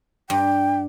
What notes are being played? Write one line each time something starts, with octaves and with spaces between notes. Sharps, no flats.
G2 G5